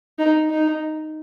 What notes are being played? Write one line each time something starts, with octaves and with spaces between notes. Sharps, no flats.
D#4
D#4